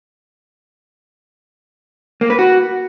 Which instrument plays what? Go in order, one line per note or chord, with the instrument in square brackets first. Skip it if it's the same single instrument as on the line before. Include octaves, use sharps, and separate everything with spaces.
[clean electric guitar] A#3
B4
F#4